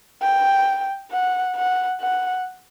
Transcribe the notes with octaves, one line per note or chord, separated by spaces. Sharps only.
G5
F#5
F#5
F#5